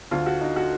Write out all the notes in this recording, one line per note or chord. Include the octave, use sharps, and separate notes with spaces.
D2 D3 F4
F#4
D#4
F#4